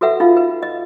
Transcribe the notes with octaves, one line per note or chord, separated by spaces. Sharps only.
F#4 A4 B4 E5 F#5
D#4 F4 F5
B4
D#5